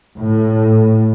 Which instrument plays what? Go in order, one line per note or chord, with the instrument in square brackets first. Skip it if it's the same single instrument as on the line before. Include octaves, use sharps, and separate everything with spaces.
[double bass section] A2